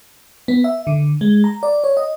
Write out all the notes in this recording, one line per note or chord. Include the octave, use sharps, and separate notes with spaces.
B3
E5
D3
G#3
A#5
D5
C#5
D#5